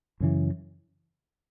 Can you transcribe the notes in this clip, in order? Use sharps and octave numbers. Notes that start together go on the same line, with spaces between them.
F#2 C#3 E3